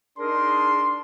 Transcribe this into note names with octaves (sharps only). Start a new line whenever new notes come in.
D4 D#4 G#4 A#4 C6